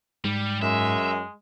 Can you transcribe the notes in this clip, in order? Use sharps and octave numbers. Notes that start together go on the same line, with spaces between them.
G#2 G3
F#2 G#3 E5